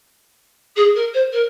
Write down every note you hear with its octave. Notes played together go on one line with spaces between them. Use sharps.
G#4
A#4
C5
A#4